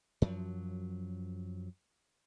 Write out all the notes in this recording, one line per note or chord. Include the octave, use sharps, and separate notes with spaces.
F#2 F3 F#3